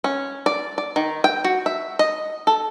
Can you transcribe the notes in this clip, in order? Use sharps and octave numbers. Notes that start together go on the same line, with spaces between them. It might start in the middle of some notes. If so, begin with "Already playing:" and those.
C#4
D5
D5
D#3
G5
F#4
E5
D#5
A4